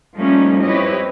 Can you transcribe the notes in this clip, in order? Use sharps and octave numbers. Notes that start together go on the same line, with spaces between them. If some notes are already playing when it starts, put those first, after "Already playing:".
F3 G3 A3 A#3 C#4 D#4
C4 E4 G4 B4 C#5 D#5